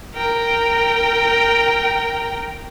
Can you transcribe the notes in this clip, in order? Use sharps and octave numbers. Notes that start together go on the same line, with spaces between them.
A#4 G5